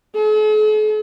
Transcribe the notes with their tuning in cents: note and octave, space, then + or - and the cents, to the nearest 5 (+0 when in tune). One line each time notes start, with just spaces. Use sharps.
A4 -45